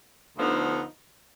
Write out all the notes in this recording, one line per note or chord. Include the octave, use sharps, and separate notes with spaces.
D2 D3 F3 B3 D#4